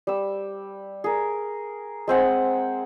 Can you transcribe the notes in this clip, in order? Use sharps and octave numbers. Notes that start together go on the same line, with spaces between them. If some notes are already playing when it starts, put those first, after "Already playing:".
G3 E6
G#4 A#4
G#3 C4 F#5 G#5